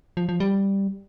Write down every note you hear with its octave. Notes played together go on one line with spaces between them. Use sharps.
F3
F3
G3